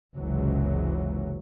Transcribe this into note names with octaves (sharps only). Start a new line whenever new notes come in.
F#1 C#2 C3 E3 F#3